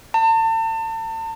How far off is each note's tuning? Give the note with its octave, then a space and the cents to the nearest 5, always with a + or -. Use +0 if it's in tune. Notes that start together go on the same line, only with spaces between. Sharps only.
A5 +35